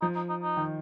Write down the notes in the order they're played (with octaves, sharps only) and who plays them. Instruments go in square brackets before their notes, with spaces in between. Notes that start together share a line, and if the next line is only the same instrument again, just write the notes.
[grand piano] F3 [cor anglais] D#4
[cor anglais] D#4
D#4
D#4
[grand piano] D#3